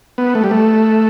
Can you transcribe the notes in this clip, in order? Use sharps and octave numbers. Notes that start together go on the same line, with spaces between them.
B3
A3
G3
A3